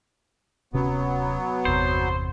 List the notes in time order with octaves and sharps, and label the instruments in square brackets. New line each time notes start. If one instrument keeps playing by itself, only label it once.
[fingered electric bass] D1 C3 C#4 [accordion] F#3 B3
[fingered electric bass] G1 E2 C3 [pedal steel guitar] C5